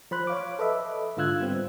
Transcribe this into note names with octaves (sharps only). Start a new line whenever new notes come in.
F3 C5 B5 F#6
C#5 F5 D6
A4 B4 D#5 E5
G#2 D3 F4 E6 F#6 G#6
G3 B3 C4